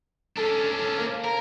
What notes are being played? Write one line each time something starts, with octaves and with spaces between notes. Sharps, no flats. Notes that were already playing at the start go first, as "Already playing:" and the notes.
C#4 D4 A4
A4
A#3
A#4